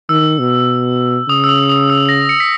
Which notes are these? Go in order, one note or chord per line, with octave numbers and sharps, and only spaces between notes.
D#3 E6
B2
C#3 D#6
E6
D#6
D#6
E6
A#6
C#7
B6